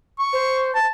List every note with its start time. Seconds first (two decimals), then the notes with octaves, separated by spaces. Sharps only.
0.19 C#6
0.33 C5
0.75 A5